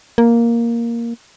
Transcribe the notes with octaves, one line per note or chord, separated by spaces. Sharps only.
A#3